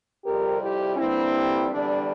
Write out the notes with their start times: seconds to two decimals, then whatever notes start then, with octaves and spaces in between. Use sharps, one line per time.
0.24 F2 C3 G3 G4 A#4
0.61 E4 G4
0.97 G2 D3 G3 A#3 C4 E4
1.70 E2 D3 G3 D4